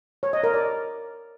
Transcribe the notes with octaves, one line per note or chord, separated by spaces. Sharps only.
C#5
D#5
A#4
D5